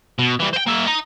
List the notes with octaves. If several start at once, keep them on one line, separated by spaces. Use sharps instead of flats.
B2
E3 G3
C5 G5
A#3 E5
D#5 A#5